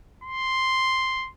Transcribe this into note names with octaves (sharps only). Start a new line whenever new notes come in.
C6